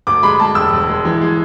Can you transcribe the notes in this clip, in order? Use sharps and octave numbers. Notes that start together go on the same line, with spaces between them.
D2 D6
G#3 B5
G#3 A5
E1 E6
E1
G#3
E3
G#3